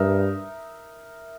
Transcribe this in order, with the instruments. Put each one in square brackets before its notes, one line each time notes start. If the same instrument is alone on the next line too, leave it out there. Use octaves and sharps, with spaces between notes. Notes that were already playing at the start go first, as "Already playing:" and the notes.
Already playing: [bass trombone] G2 [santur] D#4 A#4 E5